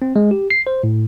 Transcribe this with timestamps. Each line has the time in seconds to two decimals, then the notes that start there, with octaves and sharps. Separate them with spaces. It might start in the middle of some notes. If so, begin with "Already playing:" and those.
0.02 C4
0.16 G#3
0.31 G4
0.50 C7
0.67 C5
0.83 A2